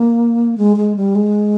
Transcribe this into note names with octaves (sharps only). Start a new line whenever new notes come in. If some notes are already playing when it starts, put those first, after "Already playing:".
Already playing: A#3
G#3
G#3
G3
G#3